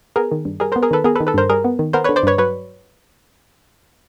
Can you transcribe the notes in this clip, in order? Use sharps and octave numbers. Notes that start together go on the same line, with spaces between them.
B3 G#4 A#4
D#3
G2
G3 G#4 A#4
B3 A#4 C5
G#4 A#4
D#3 A4 B4
B3 G#4 A#4
A4 B4
D#3
A4 B4
G2 A#4 C5
G3 G#4 A#4
B3
D#3
B3 A#4 C5
D3 B4 C#5
C5 D5
G2 B4 C#5
F#3 B4 C#5